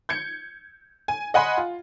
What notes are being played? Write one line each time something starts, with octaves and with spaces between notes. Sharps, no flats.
G6 G#6 C#7
G#5
D#5 F#5 G#5 B5 C6
F4